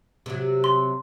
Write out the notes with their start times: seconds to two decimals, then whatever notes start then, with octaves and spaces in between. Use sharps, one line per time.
0.26 C3 F#3
0.64 C6